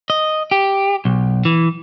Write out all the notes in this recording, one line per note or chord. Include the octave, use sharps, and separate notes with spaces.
D#5
G4
B1
E3